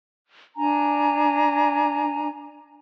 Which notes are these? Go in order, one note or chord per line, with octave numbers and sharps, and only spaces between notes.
D4 G#5 A#5